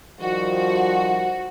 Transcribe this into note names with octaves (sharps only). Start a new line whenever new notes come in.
D#3 F3 G3 F#4